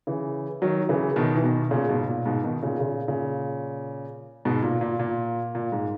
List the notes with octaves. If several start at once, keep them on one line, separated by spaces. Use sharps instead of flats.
C#3 E3
D#3 F#3
C#3 E3
B2 D#3
E3
B2 D#3
A#2 C#3
G#2 B2
A#2
G#2 B2
B2 D#3
A#2 C#3
A#2 C#3
A#2 C#3
G#2 B2
A#2
A#2
A#2
A#2
G#2